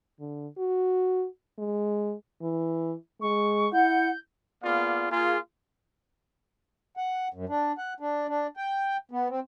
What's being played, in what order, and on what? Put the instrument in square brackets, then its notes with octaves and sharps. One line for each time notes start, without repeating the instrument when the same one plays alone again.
[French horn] D3
F#4
G#3
[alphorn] E3
[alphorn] G#3 [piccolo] C#6
[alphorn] E4 [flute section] F#5 [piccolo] G6
[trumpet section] A#3 B3 F4 G#4 D5 F5
A#3 F4 G#4
[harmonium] F#5
F#2
D4
F#5
D4
D4
G5
B3
C4